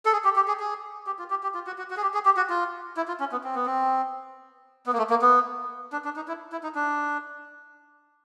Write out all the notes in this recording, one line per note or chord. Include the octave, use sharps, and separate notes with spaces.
A4
G#4
G4
G4
G#4
G#4
G4
F4
G4
G4
F4
F#4
F#4
F#4
G#4
G4
G#4
G4
F#4
F4
E4
F4
C#4
B3
C4
B3
C4
B3
A#3
A3
A#3
B3
D4
D4
D#4
E4
E4
D#4
D4